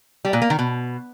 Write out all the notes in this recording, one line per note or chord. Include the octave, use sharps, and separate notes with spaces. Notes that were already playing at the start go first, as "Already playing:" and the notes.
G3
A#2
A#3
D#3
B2